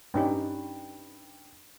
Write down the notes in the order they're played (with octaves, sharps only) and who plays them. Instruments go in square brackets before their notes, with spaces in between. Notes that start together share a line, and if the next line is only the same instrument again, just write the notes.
[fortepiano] G2 [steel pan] C#4 D#4 G4